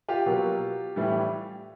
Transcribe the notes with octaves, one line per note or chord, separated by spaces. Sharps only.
F4 G4
B2 F#3 A#3
A2 E3 G3